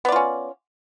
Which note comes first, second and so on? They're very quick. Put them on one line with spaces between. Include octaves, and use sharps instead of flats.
B3 D5 F4 C#4